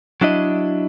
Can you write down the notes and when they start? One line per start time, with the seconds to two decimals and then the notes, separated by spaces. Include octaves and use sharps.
0.21 F#3 D4 E4 D#5